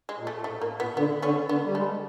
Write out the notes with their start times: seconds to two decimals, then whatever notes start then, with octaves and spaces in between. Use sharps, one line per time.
0.09 G#3
0.18 A#2
0.27 A3
0.44 A2 A3
0.61 A2 A#3
0.79 A#2 B3
0.96 D3 B3
1.22 D3 B3 C#4
1.48 D3 B3
1.64 G3
1.75 G#3 A3